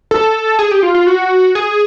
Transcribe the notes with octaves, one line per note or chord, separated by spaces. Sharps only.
A4
G#4
G4
F4
F4
F#4
G#4